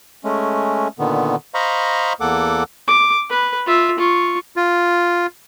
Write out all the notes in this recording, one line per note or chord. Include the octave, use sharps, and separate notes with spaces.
G#3 A3 C#4
A#2 D3 D#3 B3
C5 D#5 F5 A#5 B5 C#6
E2 A#3 A4 F#5 D6
D6
B4
F4 E5
F4 C#6
F4